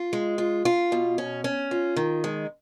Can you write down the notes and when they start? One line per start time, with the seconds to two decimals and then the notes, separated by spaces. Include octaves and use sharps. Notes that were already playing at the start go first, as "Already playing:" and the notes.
Already playing: F4
0.13 G#3
0.38 F4
0.65 F4
0.92 B2
1.18 C#4
1.44 C#4
1.71 F4
1.97 D#3
2.24 G#3